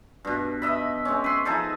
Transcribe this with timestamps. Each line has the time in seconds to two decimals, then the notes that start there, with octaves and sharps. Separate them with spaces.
0.25 G2 B2
0.62 D#5 E5 B5
1.05 G#3 C4 C#4
1.24 B4 C6
1.45 F3 D#4 G#4 A4